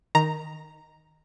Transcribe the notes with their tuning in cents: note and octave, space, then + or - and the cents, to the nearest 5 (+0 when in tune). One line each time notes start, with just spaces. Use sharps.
D#3 +0 A#5 +0